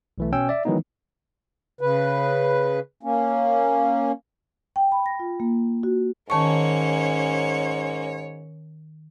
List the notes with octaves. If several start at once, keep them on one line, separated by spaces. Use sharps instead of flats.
B1 E3 A3
B2 C#4 G5 E6
D5 E5
D#3 E3 F#3 G#3 B3 D#4
C#3 B4
A#3 C#4
G5
B5
A#6
F4
A#3
F#4
G#2 D#3 A#3 C#4 C#5 A5 C#6